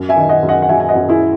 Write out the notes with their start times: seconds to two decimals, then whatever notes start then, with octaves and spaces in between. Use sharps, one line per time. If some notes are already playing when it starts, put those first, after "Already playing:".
Already playing: F#2
0.09 E5 G#5
0.16 D#3
0.29 D#5 F#5
0.43 F#2
0.49 D#5 F#5
0.62 F#5
0.69 F#3 E5 G#5
0.80 G#5
0.89 D#5 F#5
0.96 F#2
1.09 E4 G#4